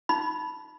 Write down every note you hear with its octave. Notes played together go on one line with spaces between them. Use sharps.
D#4 B5